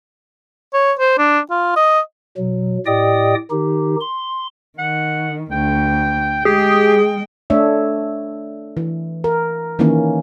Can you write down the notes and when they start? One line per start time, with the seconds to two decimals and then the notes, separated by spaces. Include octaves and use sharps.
0.74 C#5
0.99 C5
1.18 D4
1.50 F4
1.76 D#5
2.37 B2 F#3
2.86 A2 G4 D5 D#5 G5 D#6
3.51 D#3 D#4 G4
4.01 C6
4.79 D#3 F#5
5.52 D2 G5
6.45 G#3 G4 G#4 G5
7.50 A3 D4 C#5 E5
8.77 E3
9.24 A#4
9.79 D#3 E3 A#3 C#4